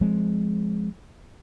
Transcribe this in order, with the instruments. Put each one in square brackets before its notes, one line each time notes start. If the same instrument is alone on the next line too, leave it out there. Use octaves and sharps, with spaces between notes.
[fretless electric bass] F3 G#3 C4